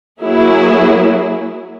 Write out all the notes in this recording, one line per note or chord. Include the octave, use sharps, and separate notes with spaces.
F#3 A#3 E4 G#4